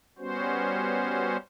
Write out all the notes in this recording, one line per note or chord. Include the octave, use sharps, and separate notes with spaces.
G3 B3 C#4 F#4 C5